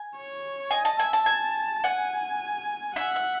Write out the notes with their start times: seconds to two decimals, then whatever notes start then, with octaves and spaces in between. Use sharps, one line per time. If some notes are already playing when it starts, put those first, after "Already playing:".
Already playing: G#5
0.15 C#5
0.71 D#5 G#5
0.85 A5
0.99 E5 G#5
1.13 A5
1.26 G#5 A5
1.84 F#5 G#5
2.96 E5 F#5
3.16 E5